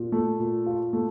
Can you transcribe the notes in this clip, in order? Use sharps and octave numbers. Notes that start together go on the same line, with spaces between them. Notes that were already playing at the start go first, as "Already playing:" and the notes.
Already playing: A#2
A3
A#2
F4
A3